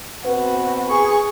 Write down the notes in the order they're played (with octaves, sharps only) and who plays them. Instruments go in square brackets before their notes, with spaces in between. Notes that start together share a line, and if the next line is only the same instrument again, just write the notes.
[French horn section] B2 C4 B4 [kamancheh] F#4
[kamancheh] G#4 C#6